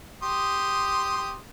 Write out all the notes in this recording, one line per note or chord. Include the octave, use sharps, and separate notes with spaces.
G4 C6 D#6